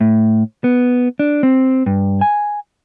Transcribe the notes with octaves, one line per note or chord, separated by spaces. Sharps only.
A2
B3
D4
C4
G2
G#5